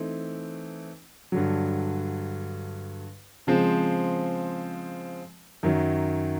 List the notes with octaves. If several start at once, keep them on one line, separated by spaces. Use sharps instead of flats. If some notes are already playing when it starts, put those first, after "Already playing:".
Already playing: E3 A3 C4 D#4
G2 D3 F#3
C#3 F3 G#3 C4
F#2 D#3 F#3